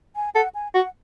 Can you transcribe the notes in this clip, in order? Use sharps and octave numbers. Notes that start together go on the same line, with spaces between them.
G#5
A4 F#5
G#5
F#4 F#5